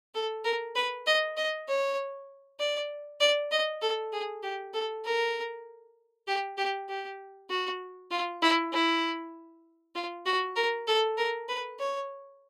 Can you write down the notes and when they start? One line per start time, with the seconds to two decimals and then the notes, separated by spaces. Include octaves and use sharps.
0.15 A4
0.44 A#4
0.75 B4
1.07 D#5
1.37 D#5
1.68 C#5
2.60 D5
3.20 D5
3.51 D#5
3.82 A4
4.12 G#4
4.43 G4
4.73 A4
5.05 A#4
6.27 G4
6.57 G4
6.89 G4
7.50 F#4
8.11 F4
8.42 E4
8.72 E4
9.95 F4
10.26 F#4
10.56 A#4
10.87 A4
11.17 A#4
11.48 B4
11.79 C#5